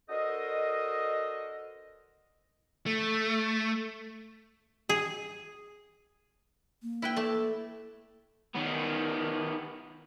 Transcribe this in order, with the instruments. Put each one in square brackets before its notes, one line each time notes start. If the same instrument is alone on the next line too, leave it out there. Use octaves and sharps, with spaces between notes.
[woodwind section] D4 F#4 A4 A#4 C5 D#5
[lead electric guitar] A3
[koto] G#4
[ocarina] A#3
[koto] E4 B4 G5
A3 D5 A5
[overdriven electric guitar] D#3 B3